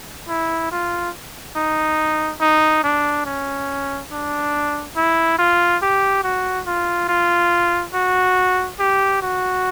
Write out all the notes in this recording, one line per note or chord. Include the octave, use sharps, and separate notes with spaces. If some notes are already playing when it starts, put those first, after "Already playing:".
E4
F4
D#4
D#4
D4
C#4
D4
E4
F4
G4
F#4
F4
F4
F#4
G4
F#4